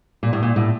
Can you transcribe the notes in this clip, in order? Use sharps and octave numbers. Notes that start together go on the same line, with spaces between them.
A#2
A2
A#2
A2